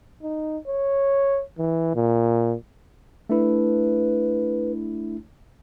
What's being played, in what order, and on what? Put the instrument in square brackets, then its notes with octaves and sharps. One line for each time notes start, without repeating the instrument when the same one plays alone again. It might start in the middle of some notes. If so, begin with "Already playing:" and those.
[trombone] D#4
C#5
E3
A#2
[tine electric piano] A3 D4 E4 [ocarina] B4